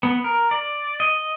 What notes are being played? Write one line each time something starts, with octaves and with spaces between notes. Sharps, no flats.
B3
A#4
D5
D#5